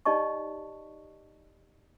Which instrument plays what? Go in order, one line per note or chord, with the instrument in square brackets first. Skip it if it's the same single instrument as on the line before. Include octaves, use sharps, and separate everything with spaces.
[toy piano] D#4 G4 D5 D#5 A5 C#6